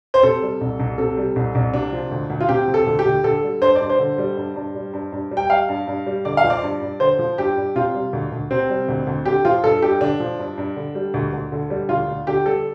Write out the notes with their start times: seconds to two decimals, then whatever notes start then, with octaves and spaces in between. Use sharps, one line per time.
0.14 C5
0.23 C3 A4
0.42 G3
0.61 C2
0.80 C2
0.98 C3 A4
1.17 G3
1.36 C2
1.55 C2
1.74 C3 D4
1.93 F3
2.11 D2
2.30 D2
2.41 F4
2.49 C3 G4
2.68 F3
2.74 A4
2.87 D2
2.99 G4
3.06 D2
3.24 D3 A4
3.43 G3
3.62 G2 C5
3.75 D5
3.81 G2
3.90 C5
3.99 D3
4.18 G3
4.37 G2
4.56 G2
4.75 G3
4.93 G2
5.12 G2
5.31 G3
5.37 G5
5.50 G3 F5
5.69 G2
5.87 G2
6.07 G3
6.25 D3 D5
6.37 F5
6.44 F3
6.50 D5
6.63 G2
6.81 G2
7.00 D3 C5
7.19 F3
7.38 G2 G4
7.57 G2
7.75 C3 F4
7.94 G3
8.13 D2
8.32 D2
8.51 C3 C4
8.69 G3
8.89 D2
9.07 D2
9.25 D3 G4
9.45 F3 F4
9.64 G2 A4
9.82 G2 G4
10.01 D3 D4
10.20 F3
10.39 G2
10.58 G2
10.76 D3
10.95 G3
11.14 D2
11.33 D2
11.52 D3
11.70 G3
11.89 D2 F4
12.08 D2
12.27 D3 G4
12.46 G3 A4